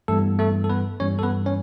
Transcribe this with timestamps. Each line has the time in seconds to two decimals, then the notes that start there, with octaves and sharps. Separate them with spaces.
0.08 G2 E3 G3 A3 B3 A4
0.39 A3 A4
0.64 A4
0.70 B3 B4
1.00 G2 E3 G3 B3 C#4 C#5
1.19 A4
1.23 B3 B4
1.46 C#4 C#5